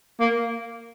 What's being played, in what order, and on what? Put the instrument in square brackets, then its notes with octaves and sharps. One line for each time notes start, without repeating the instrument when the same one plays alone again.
[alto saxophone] A#3